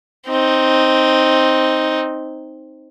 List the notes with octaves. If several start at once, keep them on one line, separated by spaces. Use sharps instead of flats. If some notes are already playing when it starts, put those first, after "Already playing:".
C4 D#4